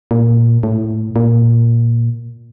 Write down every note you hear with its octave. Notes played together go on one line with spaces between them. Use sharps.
A#2
A2
A#2